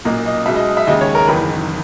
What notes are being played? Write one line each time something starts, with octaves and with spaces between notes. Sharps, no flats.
B1 A#2 A#3 D#5
D#5
B1 B2 G#3 E5
D#5
E5
D#2 C#3 G#3 D#5
C#5
A#4
F#1 E2 D#3 B4